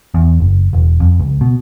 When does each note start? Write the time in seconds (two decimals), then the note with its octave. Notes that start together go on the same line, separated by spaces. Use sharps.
0.14 E2
0.40 F#1
0.73 E1
1.00 F2
1.20 C#2
1.41 B2